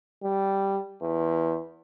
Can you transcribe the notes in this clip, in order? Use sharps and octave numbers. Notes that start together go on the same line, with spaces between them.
G3
E2